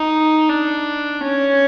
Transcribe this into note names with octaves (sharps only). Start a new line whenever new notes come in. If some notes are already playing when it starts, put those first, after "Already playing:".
Already playing: D#4
D4
C#4